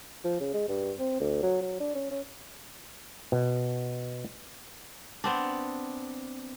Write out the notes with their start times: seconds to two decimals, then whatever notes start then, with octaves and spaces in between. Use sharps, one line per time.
0.24 F3
0.40 C#3
0.54 G#3
0.68 G2
0.99 C4
1.20 D2
1.43 F#3
1.62 F#3
1.80 D4
1.95 C#4
2.11 C#4
3.32 B2
5.24 B3 C4 D4